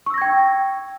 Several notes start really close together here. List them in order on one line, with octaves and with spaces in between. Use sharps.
C#6 E6 A#6 G#6 G5